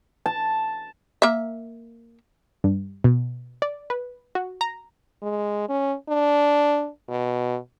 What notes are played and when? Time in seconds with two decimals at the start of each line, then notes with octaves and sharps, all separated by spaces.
0.26 A5
1.22 A#3 E5
2.64 G2
3.04 B2
3.62 D5
3.90 B4
4.35 F#4
4.61 A#5
5.22 G#3
5.69 C#4
6.09 D4
7.09 B2